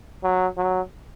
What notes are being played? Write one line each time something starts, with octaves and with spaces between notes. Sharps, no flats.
F#3
F#3